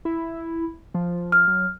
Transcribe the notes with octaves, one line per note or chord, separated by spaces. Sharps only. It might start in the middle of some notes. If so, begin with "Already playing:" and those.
E4
F3
F6
F#3